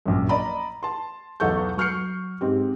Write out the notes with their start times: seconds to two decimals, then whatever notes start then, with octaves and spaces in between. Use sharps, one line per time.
0.06 A#1 F#2
0.29 D5 D#5 A#5 B5
0.83 A5 C6
1.40 B1 E2 A4 F#5 C#6 G6
1.77 F#3 C#6 F6 G6 C7 C#7
2.41 G#2 C4 G4